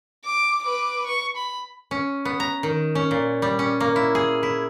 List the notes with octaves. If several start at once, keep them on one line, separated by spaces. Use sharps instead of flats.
D6
B4 D6
C#6
B5
C#4
B3
A#5
D#3
C#4
A#2
G3
C#4
A#3
E4
G#4
E4